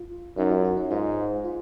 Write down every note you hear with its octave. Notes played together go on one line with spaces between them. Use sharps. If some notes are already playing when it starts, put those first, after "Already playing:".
Already playing: F4
F#2 D#4
F4
F#4
D#4
G#2 F4
F4